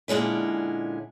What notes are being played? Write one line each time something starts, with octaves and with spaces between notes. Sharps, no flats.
A#2 D3 G#3 C#4 E4